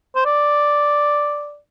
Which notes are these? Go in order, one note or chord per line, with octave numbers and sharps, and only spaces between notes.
C5
D5